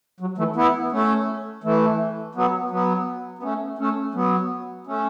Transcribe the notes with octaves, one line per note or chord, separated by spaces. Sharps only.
F#3
E3 A3
B3 E4
A3 C#4
E3 A3
F#3 B3
F#3 B3
B3
A3 C#4
A3 C#4
F#3 B3
A3 C#4